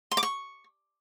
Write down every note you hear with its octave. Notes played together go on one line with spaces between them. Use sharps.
C6
D6
C#6